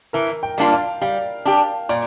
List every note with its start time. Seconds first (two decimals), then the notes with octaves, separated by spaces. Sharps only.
0.13 E3 A#4
0.43 G5
0.58 G3 A#3 D4 F4
0.72 F5
1.01 G3 F5
1.45 D4 G4
1.89 A#2 D5